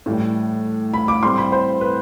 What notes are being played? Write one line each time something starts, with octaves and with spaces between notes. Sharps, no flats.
A2 E3 G3
B5
D6
A2 E3 G3 C4 C6
B5
C5
B4